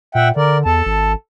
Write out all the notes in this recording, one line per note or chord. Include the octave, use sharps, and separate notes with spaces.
A#2 E5 F#5 G5
D3 A#4 D5
E2 A4 A5
G#1